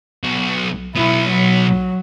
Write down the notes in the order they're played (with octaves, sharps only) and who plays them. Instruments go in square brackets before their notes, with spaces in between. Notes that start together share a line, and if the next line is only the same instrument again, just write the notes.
[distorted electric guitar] B1 F#4
[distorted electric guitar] B1 B3 [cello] E4
[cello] F#3